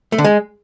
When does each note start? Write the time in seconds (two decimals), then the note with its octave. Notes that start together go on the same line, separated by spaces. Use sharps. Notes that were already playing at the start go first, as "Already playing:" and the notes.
0.12 A3
0.18 D3
0.24 G#3